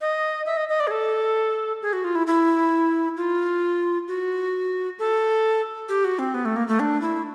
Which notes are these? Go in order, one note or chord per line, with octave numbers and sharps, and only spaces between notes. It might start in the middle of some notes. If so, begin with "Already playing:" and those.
D#5
E5
D#5
D#5
D5
G#4
A4
G#4
F#4
F4
E4
E4
F4
F#4
A4
G4
F#4
C4
B3
A3
A#3
A3
D4
E4